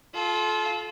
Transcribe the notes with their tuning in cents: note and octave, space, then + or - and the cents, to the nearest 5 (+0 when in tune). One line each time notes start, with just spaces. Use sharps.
F4 +5 A4 -30